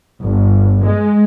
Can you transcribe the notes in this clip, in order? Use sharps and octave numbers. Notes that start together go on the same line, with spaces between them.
G1
G#3